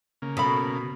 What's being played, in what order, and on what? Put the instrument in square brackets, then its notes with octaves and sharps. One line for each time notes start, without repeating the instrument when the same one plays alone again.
[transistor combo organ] C#3 A#3
[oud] B2 [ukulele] A4 B5